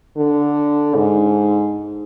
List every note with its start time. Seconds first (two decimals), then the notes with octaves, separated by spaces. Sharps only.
0.17 D3
0.95 G#2